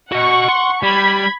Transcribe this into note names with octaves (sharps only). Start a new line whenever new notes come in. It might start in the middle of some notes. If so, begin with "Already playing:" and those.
F#4 D#5 F#5 C#6
C6
G3 B5 G#6